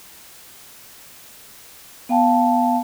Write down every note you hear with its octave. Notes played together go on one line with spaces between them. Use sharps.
B3 F5 G5 A5